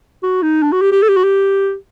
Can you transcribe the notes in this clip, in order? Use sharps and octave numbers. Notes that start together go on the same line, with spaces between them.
F#4
D#4
D4
F#4
G4
G4
A4
G4
F#4
G4